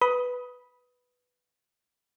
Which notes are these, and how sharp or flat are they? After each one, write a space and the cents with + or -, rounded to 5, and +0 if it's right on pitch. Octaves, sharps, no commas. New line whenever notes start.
B4 +0 B5 -5 D#6 +15